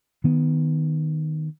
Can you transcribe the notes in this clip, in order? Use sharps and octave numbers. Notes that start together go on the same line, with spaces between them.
D#3 B3